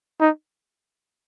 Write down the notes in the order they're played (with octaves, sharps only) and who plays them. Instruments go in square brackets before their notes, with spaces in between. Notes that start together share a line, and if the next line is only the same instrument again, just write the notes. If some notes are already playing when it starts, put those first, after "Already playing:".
[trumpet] D#4